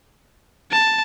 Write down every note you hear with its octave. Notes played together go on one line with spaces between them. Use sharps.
A5